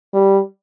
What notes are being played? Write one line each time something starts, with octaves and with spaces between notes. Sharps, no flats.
G3